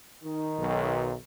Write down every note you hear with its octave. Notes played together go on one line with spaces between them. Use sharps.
D#3 D#4
B1